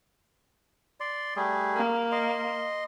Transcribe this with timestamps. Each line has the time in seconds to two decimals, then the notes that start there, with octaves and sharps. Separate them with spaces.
1.00 D5 C6
1.36 G3 A3 G#4
1.76 A#3
2.12 D#5 C6